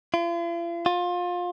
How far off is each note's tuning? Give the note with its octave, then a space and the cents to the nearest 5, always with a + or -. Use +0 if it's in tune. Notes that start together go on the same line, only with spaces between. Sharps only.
F4 -45
F4 +25